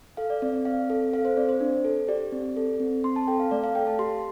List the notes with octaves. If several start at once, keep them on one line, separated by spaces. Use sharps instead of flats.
A4 F5
D5
C4 D5
C4 F5
A4
A4 F5
C5
C4 D5
C5
D4
A4
G4 D5
C4
A4
C4
C4 C6
A5
A4 G5
F5
A3 D5
F5
A4 G5
A5
G4 C6